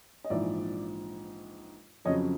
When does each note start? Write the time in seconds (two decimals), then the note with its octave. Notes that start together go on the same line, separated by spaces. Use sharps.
0.24 D#5
0.30 A#1 G#2 E3 D5 E5
2.05 F2 C#3 F#3 C#5 D#5